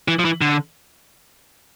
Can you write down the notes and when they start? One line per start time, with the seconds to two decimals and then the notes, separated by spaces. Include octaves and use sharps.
0.08 E3
0.19 F3
0.25 E3
0.41 D3